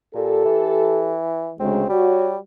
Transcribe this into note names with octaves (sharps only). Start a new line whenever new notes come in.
A#2 G4 A4
E3
D2 C#3 G#3 C4
G3 F#4 C#5